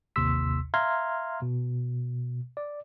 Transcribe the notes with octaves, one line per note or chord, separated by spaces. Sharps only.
A1 D#2 C3 C6 E6 B6
E5 F5 A#5 C6 F6 G#6
B2
D5